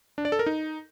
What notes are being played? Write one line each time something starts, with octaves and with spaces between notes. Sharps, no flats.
D4
D5
A4
A#4
D#4